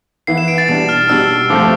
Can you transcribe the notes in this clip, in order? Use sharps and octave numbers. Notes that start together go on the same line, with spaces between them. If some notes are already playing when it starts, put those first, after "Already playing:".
E3 B3 E4 C7
E7
D7
A6
B2 G3 D4 A6
F6
B2 G3 D4 E6
G2 F3 A3 C4 D6